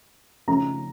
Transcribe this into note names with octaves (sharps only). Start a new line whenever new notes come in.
C#3 F3 A3 C#4 A#5